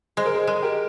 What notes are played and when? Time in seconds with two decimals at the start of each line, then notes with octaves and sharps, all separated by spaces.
0.17 G#3 C5
0.26 A#4
0.34 G#4 C5
0.47 G#3
0.62 G4 A#4